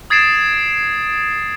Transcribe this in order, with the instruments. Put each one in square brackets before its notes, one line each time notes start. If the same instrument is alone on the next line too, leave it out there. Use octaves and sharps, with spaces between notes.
[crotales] D#6 G#6 A6 C7 D7 E7